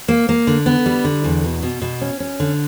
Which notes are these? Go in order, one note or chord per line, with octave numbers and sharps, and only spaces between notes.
A#3
A#3
D3
B3
G3
D3
E2
B2
B2
B2
C#4
C#4
D3